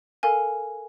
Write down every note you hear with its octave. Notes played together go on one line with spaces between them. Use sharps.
A4 A#4 F5 G#5